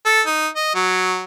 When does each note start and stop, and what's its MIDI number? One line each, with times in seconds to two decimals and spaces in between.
0.05 0.21 69
0.27 0.48 63
0.56 0.72 75
0.75 1.24 54